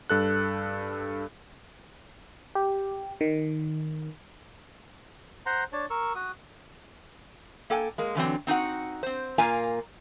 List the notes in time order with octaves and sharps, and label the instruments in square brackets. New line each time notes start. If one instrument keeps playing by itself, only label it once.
[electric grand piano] G2 A4 F#6
[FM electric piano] G4
D#3
[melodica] C5 F#5 A#5 C6
D4 C#5 A5
A#4 C#6 E6
F#4 D#6
[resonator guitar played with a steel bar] A#3 A4 G5 G#5
G#3 A#3
D3 E3 F#3 C4
C4 D#4 F#4 F#5
C4 C5
A#2 A#3 F4 A#4 F5 G#5